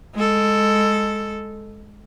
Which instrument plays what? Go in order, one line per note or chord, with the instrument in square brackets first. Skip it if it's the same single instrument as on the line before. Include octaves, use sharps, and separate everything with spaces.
[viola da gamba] G#3 A4